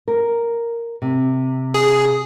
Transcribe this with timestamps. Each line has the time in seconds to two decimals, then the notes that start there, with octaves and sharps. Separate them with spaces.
0.08 A#4
1.02 C3
1.74 G#4